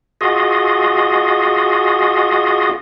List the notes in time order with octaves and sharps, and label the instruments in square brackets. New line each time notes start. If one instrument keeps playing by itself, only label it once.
[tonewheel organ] F4 F#4 G#4 D#5